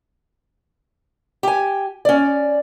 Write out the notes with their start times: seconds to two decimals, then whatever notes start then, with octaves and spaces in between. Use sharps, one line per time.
1.43 G4 G#5
2.05 C#4 D5